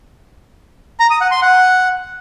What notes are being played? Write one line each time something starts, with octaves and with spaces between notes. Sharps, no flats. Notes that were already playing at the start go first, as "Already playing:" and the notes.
A#5
D#6
F#5
C6
F#5